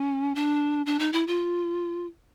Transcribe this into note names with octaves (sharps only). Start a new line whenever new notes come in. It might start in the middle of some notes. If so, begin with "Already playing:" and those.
Already playing: C#4
D4
D4
D#4
E4
F4